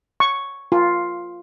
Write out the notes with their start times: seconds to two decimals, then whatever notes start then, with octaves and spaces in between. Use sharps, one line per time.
0.20 C#6
0.72 F4